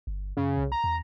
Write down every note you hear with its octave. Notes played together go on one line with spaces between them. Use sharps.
G1
F#2 C#3
C2
A#5
E2